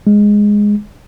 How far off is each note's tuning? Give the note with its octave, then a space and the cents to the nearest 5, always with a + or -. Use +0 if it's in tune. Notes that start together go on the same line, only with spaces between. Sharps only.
G#3 -5